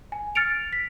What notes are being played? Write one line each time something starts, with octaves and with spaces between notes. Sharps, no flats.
G#5
F6 A6 C#7 D7 F7
B6